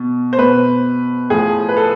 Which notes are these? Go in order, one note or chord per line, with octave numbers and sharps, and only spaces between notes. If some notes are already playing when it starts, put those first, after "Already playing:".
Already playing: B2
C5
B2 B4
A2 F3 G#4
B4
A4